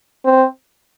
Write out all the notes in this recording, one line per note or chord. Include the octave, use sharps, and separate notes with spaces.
C4